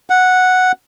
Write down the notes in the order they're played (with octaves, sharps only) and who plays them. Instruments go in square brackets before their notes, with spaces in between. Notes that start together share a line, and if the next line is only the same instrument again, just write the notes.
[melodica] F#5